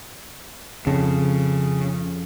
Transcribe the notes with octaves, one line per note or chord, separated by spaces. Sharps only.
F2 C#3